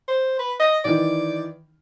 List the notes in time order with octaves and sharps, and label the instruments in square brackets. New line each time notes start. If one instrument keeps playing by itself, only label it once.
[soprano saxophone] C5
B4
D#5
[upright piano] D#3 E3 D#4 [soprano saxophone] D5